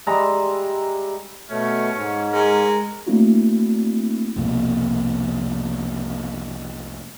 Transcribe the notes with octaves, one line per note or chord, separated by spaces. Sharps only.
G3 G#3 E5 A#5
B2 A3 C#4 C#5
G#2
G#3 C#4 A#4
A3 A#3 C4 D4 E4 F#4
C2 F2 B2 A#3